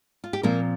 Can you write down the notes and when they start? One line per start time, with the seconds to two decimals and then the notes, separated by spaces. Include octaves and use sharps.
0.24 F4
0.33 G4
0.43 A#2 F3 A#3 C4 A#4